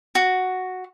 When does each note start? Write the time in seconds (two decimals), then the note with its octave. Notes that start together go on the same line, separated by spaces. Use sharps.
0.15 F#4